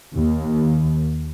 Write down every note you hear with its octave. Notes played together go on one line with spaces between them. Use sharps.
D#2